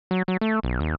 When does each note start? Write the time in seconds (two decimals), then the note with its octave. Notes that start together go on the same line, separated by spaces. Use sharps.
0.11 F#3
0.28 F#3
0.41 A3
0.63 B1
0.80 D#2